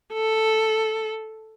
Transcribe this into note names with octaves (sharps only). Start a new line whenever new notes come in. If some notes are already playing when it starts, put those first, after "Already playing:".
A4